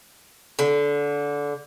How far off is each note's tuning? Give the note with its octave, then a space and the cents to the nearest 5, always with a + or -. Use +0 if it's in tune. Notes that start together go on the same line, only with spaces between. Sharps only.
D3 -20